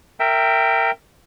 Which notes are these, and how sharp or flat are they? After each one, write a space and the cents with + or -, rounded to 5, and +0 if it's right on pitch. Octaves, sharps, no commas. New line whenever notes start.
A#4 -15 E5 +10 G5 +0